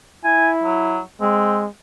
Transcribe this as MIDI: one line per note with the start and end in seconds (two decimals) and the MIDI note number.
0.24 1.02 64
0.24 0.49 80
0.63 1.00 54
1.21 1.68 56
1.21 1.61 60